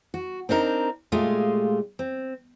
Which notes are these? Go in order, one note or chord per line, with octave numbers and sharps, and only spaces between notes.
F#4
C4 D4 D#4 A#4
A#2 G#3 A3 F4 G4 G#4
C4